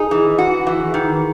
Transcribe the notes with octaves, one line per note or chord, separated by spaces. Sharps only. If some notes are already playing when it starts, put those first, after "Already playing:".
Already playing: D#4 G#4
E3
F#4
E3
D#3